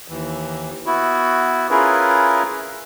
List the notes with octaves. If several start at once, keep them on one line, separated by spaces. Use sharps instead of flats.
D#2 E3
B3 E4 F#4
C#4 E4 F4 G#4 A#4 B4